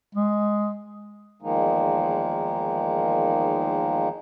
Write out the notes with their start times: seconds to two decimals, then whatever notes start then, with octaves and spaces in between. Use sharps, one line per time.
0.15 G#3
1.42 E2 D#3 F3 G#3 A#3 D#4